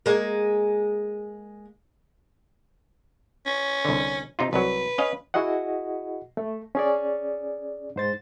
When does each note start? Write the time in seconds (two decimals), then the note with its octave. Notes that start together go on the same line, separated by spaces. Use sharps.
0.06 G#3 A#3
3.46 C#4
3.85 C2 D3
4.39 C3 D#4 F4
4.53 C2 F#3 B4
4.98 C#4 D#5 F5
5.34 E4 F#4 G#4 D#5 F#5
6.37 A3
6.75 C#4 G#4 D5
7.96 G#2 C5 A6